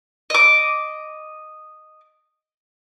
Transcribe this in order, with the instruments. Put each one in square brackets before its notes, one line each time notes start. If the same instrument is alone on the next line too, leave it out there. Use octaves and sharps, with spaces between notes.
[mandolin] D#5 D6